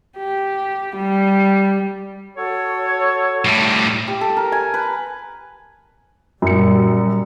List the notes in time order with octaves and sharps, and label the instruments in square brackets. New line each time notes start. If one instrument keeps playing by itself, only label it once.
[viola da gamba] G4
G3
[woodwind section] F#4 A4 C#5
[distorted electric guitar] A2 G3
[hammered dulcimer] G4
A4
A#4
G#5
B4
[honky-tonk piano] F#2 C#7 [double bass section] A#2 G3